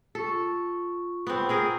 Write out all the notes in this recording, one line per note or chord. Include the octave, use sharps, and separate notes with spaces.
F4 A4 C#6
B3 C4
C4 G#4 A#4